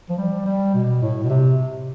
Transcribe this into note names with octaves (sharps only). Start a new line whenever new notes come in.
F3
G3
G3
B2
A2
B2
C3